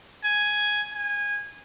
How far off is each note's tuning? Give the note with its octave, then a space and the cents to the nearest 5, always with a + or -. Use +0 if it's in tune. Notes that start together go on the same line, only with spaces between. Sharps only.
G#5 +5
G#5 -20